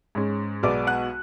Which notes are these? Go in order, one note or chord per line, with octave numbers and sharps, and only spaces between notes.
G#2 G#3 C#4
B1 B2 G#3 B3 D5 D6
F#5 F#6